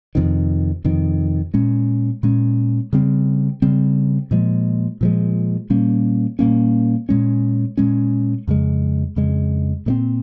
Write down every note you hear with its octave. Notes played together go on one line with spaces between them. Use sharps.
F2 C3 D#3
F2 C3 D#3
A#2 G#3 C#4
A#2 G#3 C#4
C#3 G3 C4
C#3 G3 C4
A#2 F3 G#3
A#2 F3 G#3
A#2 G3 A#3 C#4
A#2 G3 A#3 C#4
A#2 G#3 C#4
A#2 G#3 C#4
F2 C#3 G#3
F2 C#3 G#3
A#2 G#3 C4